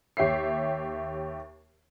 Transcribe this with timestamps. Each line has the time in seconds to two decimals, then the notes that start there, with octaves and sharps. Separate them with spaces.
0.17 D#2 G4 C#5 E5 C7